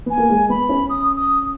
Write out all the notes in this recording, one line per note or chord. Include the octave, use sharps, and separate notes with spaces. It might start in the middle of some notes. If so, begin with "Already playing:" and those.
B3 G#5
A#3
G#3
B3 B5
C#4
D#6
D#6